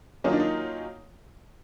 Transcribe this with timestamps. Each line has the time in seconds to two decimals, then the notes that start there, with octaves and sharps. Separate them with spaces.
0.24 D#3 F#3 A#3 C#4 D#4 F4
0.32 D4
0.40 D#4